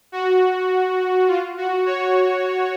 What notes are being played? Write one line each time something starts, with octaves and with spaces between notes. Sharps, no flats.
F#4
F4
F#4
C#5